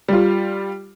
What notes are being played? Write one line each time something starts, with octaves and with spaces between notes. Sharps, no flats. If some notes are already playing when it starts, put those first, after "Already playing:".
G3 F4